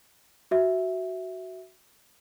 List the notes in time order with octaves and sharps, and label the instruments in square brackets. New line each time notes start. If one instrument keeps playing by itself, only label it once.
[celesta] F#4 E5